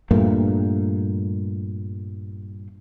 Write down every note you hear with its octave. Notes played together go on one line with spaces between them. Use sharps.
G2 A#2 A3 A#3